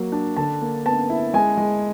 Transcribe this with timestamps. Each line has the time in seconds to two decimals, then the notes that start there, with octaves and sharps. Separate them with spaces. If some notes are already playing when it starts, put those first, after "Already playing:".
Already playing: F#3 A#3
0.12 D4
0.36 D3 A5
0.61 A#3
0.85 B3 A5
1.10 E4
1.33 G#3 G#5
1.57 G#3